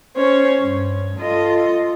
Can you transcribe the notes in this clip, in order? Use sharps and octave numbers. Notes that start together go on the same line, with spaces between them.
C#4 C5 C#5
G2
F4 A4 D#5